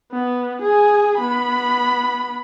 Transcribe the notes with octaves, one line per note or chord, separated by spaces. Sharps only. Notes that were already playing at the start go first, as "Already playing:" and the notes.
B3
G#4 G#5
B3 B5